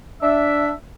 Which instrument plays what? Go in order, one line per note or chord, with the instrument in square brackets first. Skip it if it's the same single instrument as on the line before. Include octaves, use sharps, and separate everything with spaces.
[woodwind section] D4 E5